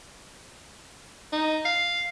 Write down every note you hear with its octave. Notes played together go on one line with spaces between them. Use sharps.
D#4
F5